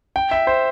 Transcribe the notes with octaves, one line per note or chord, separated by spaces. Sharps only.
G5
E5
C5